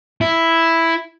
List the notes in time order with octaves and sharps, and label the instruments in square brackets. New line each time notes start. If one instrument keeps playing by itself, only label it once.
[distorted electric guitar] E4